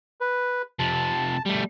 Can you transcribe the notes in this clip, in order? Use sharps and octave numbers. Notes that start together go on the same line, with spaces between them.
B4
F2 C3 A5
G3 A3